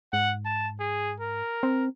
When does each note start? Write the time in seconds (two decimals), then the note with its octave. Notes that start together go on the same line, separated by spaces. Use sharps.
0.13 G#2 F#5
0.45 A5
0.80 G#4
1.20 A#4
1.63 C4